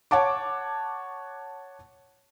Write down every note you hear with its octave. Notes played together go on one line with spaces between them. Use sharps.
C#5 F#5 A5 D6